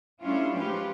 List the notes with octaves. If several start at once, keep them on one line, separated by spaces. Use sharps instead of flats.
G3 A3 C#4 D4 E4 F4
F3 G#3 C#4 F4 G4 B4